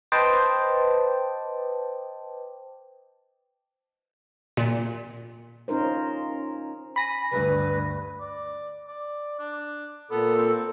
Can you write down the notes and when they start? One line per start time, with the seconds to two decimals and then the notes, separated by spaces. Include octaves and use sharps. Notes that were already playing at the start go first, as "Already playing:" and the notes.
0.12 B4 C5 D#5 G5 A5 D6
4.57 A#2
5.68 C#4 D#4 F4 A#4 C5
6.96 G#5 B5 A#6
7.31 D2 G2 B4
8.20 D5
8.87 D5
9.39 D4
10.11 A#2 B3 A4
10.36 C4